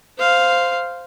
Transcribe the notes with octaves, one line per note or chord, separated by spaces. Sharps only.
C5 F5